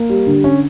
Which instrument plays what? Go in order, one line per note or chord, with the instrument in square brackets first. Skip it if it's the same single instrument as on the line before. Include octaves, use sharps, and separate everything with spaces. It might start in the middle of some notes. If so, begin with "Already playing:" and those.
Already playing: [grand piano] A#3
G3
D3
C#4